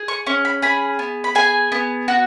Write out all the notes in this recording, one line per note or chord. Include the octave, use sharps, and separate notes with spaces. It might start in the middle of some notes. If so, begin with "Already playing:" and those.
Already playing: G#4
C#6
C#4 C#6
B5
G#4 B5
B3
B5
G#4 G#5
B3
F#4